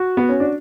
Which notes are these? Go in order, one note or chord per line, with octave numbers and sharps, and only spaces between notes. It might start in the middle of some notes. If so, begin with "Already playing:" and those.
Already playing: F#4
B3
C#4
D4